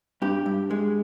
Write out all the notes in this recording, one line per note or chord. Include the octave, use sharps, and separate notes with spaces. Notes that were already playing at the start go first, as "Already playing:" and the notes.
G2 G4
G2
G#3